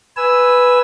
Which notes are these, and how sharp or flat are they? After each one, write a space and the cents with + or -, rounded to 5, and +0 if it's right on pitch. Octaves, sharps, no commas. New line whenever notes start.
B4 +0 G#5 +0 E6 +0